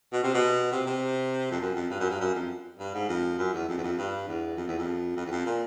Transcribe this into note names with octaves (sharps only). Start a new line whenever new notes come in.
B2
C3
B2
C3
C3
F2
F#2
F2
G2
F#2
G2
F#2
F2
G2
G#2
F2
F#2
E2
F2
E2
F2
G2
E2
F2
E2
F2
F2
E2
F2
A#2